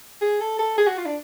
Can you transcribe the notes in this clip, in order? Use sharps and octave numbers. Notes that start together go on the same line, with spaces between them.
G#4
A4
A4
G#4
F#4
F4
D4